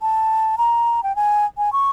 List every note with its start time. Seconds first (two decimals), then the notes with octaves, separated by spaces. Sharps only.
0.02 A5
0.58 A#5
1.03 G5
1.16 G#5
1.58 G#5
1.73 C#6